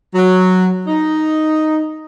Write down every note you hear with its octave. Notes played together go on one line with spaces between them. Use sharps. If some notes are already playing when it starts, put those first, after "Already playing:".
F#3
D#4